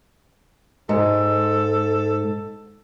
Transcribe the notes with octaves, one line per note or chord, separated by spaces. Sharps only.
G#2 A4